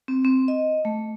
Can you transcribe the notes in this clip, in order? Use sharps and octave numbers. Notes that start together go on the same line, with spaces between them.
C4
C4
D#5
A3